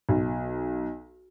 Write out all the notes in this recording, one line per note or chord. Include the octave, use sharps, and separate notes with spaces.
B1